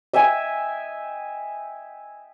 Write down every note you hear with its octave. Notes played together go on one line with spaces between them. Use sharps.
D#5 E5 G5 G#5